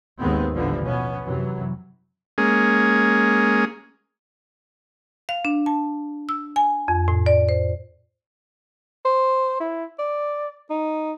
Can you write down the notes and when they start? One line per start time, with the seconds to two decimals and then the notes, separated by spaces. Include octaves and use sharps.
0.19 D#2 G#2 D#3 G#3 B3 C4
0.54 A1 D3 E3 F3 G3
0.85 B2 B3 C#4
1.25 F#2 C3 E3 F#3
2.38 G#3 A#3 C#4 G#4
5.29 F5
5.45 D4
5.66 A5
6.29 E6
6.56 G#5
6.88 F2
7.08 A2
7.26 D5
7.49 C5
9.05 C5
9.60 E4
9.99 D5
10.70 D#4